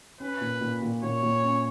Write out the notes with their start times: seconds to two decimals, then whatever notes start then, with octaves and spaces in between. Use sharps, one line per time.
0.20 C#4 B4
0.41 A#2
0.61 A#2
0.82 A#2
1.02 A#2 C#5
1.23 A#2
1.44 C#4